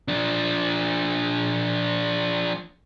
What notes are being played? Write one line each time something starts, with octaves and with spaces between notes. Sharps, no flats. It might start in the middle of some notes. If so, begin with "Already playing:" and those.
F3 D4